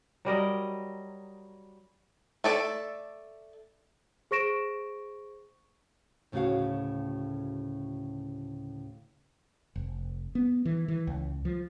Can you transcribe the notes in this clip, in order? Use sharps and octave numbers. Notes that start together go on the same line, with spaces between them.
F#3 G3 A#4 D#5
A3 A4 D5
G#4 C5 C#6 A#6 D7 E7
D2 A2 C#3 A3 F#4 F5
F1
B3
E3
E3
C#2
F3